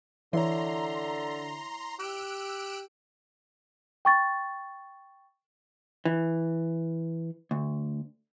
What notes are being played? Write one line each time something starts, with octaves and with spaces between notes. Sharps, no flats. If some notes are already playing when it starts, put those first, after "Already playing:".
D3 E3 E4 C#5 A#5 C6
G4 E6 F#6 D7
G5 C#6 A6
E3
D2